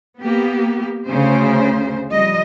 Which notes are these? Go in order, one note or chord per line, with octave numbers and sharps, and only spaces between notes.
A#3 B3 G4
D2 C#3 C5
F2 G3 D#5